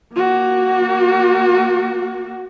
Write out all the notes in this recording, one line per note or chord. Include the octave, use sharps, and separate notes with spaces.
A#3 F#4